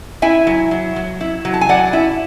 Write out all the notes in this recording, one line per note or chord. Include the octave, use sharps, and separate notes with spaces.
E4 E5 G#5
F#3
F#3
F#3
E4
F#3
A5
G#5
F#3 D5 F#5
E4